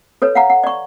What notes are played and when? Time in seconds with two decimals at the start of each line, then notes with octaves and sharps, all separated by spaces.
0.22 A4 B4 C#5
0.35 F5 F#5 A#5
0.50 F#5
0.64 D5 C#6